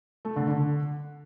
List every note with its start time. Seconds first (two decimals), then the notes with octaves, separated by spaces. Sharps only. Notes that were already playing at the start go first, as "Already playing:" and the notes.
0.25 A3
0.36 D3
0.48 D3